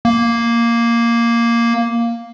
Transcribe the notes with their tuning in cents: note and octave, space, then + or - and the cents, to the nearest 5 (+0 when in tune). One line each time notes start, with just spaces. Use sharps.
A#3 +0